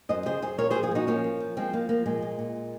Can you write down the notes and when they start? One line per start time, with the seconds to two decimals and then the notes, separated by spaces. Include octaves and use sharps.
0.09 F#2 C5 D#5
0.26 C#3 G#4 C5
0.42 F#2 G#4 C5
0.58 A#2 A#4 C#5
0.70 G#4 C5
0.75 F3
0.83 F4 G#4
0.91 A#2 D#4 F#4
1.07 F3 A#3 C#4
1.24 F3
1.40 F3
1.57 F3 G#3 C4
1.73 F3 A#3
1.89 F3 A#3
2.06 A#2 G#3
2.22 A#2
2.39 A#2